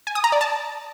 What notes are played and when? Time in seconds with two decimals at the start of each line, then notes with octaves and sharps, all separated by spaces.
0.07 G#5
0.15 D#6
0.24 A#5
0.32 D5
0.41 A5